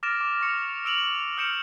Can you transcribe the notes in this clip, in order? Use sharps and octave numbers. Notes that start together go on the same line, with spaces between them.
D6 F6 A6 A#6 D7 E7
D6
C#6 C#7 F7
E6 D7 F7 F#7
D#6 F6 G6 C#7 D7 E7